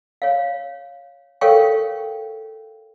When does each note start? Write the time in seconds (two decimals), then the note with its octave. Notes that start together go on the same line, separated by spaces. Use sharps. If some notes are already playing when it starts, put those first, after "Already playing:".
0.22 C#5 F5
1.41 A4 A#4 C#5 F5 G5 C#6